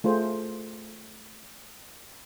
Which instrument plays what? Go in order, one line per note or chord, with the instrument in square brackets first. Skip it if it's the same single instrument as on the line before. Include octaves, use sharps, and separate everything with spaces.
[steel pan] A3 F4 G#4 C5